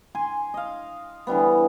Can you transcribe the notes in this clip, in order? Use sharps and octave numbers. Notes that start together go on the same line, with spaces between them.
G#5 C6
D#5 F5
D3 E3 G3 B3